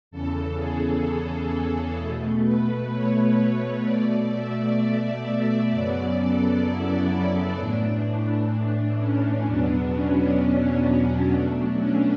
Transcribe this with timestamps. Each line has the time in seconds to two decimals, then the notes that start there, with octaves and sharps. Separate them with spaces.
0.11 E2 C#3 E3 A4
0.58 G#4
1.05 A4
1.98 B2 A3
2.44 B4
2.92 C#5
3.84 B2 A3 D5
4.31 E5
4.78 D5
5.25 E5
5.71 F#2 C#3 F#3 B3 D5
6.18 A4
6.65 E4
7.58 A2 E3 A3 D4
8.99 C#4
9.45 E2 B2 F#3 B3 D4
9.91 C#4
10.39 C#4
10.86 D4
11.32 B2 F#3 A3 D4
11.78 C#4